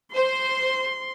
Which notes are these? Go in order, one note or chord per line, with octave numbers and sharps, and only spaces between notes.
C5 C6